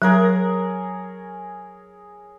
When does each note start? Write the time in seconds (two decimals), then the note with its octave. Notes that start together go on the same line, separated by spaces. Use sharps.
0.02 F#3 G#4 A#4 C#5